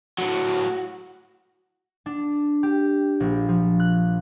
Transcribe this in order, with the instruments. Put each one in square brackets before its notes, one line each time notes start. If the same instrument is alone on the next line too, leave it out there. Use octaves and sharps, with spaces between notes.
[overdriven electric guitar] A2 F#3 [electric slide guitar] F#4
[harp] D4
G4
A#1
F3
F#6